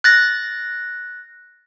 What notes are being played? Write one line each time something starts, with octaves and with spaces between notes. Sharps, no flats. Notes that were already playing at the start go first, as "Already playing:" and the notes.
F#6 A6 A#6